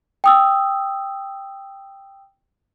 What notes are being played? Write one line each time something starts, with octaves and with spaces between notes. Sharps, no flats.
G5 D#6 E6